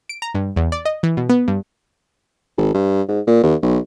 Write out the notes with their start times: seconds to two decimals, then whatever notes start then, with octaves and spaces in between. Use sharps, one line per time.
0.09 D7
0.22 A#5
0.35 G2
0.56 E2
0.72 D5
0.85 D#5
1.03 E3
1.17 B2
1.29 B3
1.48 G2
2.58 G#1
2.75 G2
3.09 G#2
3.27 A#2
3.44 D#2
3.63 B1